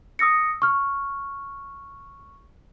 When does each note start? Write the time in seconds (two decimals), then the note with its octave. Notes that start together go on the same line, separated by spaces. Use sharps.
0.19 D#6 E6 A#6 C#7
0.62 C#6 F6